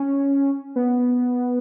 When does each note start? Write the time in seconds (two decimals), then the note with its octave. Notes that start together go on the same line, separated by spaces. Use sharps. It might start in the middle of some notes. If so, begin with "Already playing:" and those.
Already playing: C#4
0.76 B3